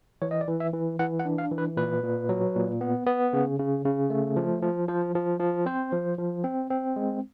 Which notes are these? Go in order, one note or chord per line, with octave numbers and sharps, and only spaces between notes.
E3 C#5
D#5
D5
E3
E5
E3
E3 F#5
F#5
D4
F5
E3
B4
A#2 B4
A#2
F#3
A#2
B3
B3
C#3
C#3
C#3
A3
F3
F3
F3 C5
F3
F3
C4 C5
F3
F3
C4
C4
G#3